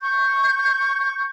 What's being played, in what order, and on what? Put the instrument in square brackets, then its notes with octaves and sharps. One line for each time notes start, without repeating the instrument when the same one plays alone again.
[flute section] C#6 G6